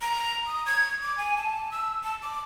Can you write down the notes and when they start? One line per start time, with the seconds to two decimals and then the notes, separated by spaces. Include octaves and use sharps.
0.01 A#5
0.47 D#6
0.66 G#6
1.02 D6
1.18 G#5
1.37 A5
1.71 E6
2.03 A5
2.22 D6